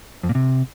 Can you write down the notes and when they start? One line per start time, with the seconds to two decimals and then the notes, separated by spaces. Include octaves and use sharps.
0.23 F2
0.29 A#2
0.35 C3